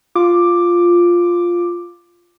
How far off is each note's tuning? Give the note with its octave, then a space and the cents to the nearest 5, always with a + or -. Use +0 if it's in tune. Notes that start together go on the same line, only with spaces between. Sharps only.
F4 +0 D6 +5